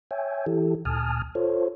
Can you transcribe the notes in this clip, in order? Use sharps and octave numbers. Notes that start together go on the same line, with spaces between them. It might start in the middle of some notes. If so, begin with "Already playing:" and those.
C#5 E5 G5 G#5
E3 E4 G4 A4
D2 A#2 G#5 A5 D#6 F6
F4 A4 C5 C#5